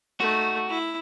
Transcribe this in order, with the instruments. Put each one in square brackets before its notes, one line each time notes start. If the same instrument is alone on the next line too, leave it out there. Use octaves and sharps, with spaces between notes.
[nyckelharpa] A3 D#4 [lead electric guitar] F#4
[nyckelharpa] E4